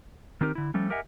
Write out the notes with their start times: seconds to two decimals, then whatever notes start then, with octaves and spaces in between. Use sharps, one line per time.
0.41 D#3 C4 D#4 G4 A#4
0.55 D3 E4
0.74 F3 G3 A3 C#4
0.90 G4 A#4 D#5 E5 F#5 G#5